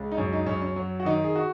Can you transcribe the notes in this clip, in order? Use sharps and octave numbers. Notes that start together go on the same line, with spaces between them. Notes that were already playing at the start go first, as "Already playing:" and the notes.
Already playing: C#2
D#4
F#2 C#4
D#4
F#2 C#4
C#4
F#3
F#4
D#3 D#4
G#4
F#4